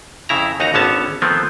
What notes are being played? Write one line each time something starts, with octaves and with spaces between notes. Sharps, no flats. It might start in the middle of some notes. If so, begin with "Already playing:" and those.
F2 C#3 E4 A#5
D#2 D#4 F#4 A#5
G#1 D3 B3 C#4 C#5 A5
D#3 F3 A3 B3 C4